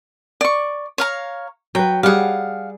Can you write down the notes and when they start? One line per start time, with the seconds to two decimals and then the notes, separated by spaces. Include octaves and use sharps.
0.41 D5 C#6
0.98 C#5 F5 A#5
1.75 F#3 B4 G5
2.03 G3 G#4 F5 F#5